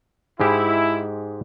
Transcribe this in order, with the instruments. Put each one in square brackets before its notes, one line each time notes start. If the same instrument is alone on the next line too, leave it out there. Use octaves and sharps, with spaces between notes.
[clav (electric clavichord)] G#2 G#3 G4 [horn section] E4